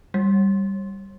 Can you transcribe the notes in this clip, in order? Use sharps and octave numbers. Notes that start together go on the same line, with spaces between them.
G3